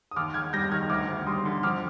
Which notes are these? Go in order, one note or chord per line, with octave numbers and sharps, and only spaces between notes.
D#6
D#2 D6 F6
D#2 F6 G#6
G3 G6 A#6
D#3 F6 G#6
D2 D6 F6
D2
G3 C6 D#6
D3
F2 D6 F6